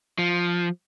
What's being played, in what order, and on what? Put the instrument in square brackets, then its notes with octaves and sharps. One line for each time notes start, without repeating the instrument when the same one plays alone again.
[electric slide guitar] F3